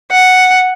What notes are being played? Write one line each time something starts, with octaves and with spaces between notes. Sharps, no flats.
F#5